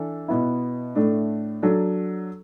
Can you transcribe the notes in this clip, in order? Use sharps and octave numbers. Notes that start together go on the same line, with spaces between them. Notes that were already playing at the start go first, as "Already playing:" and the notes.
Already playing: E3 D4 A4
B2 B3 E4
A2 A3 D4
F#3 D4 A4